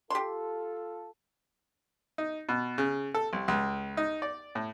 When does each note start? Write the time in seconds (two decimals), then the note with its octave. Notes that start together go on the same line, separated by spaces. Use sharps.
0.10 F4 G4 A4 C6
2.18 D#4
2.49 B2
2.78 C#3
3.14 A4
3.33 C2
3.48 C#2
3.97 D#4
4.22 D5
4.55 A2